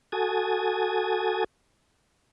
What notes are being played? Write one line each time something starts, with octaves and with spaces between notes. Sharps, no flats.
F#4 A4 G#5 D#6